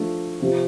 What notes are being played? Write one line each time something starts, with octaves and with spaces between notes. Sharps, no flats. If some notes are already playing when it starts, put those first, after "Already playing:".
Already playing: F3 A3 D4
C3 F3 C4